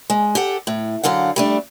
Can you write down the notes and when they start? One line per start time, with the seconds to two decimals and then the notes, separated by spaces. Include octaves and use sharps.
0.10 G#3
0.35 G4 A4 F#5
0.67 A2
1.03 F#2 D3 F#3 F5 F#5
1.36 G3 A3 D4